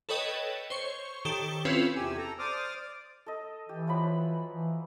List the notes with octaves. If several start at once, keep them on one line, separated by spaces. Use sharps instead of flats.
A4 B4 C#5 D#5 G5
C5 C#5 C#6
D#3 G4 A4 C#6 G7
C4 C#4 E4 F4 B4
E2 C3 G4 G#5 E6
A4 A#5
C5 D5 D6 D#6 F6
D5
A4 D#5
E3 G4
F3 F#3 B5
E3